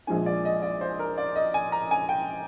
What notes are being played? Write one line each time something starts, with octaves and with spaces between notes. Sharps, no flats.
A#1 A#2 F3 G#3 D4 G#5
D5
D#5
D5
C5
A#4
D5
D#5
G#5
A#5
G#5
G5